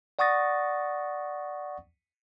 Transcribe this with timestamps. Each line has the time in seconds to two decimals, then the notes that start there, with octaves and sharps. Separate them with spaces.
0.19 D5 F#5 C#6 D#6 A6 A#6